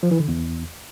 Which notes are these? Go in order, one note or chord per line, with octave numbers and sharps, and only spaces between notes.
F3
E3
D3
E2